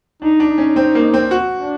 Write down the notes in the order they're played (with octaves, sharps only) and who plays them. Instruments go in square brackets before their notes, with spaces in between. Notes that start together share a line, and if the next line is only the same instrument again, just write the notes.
[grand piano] D4 [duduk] D#4
[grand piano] D4
[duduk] D#4
[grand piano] C#4
C4
A#3
C4
F#4
[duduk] D4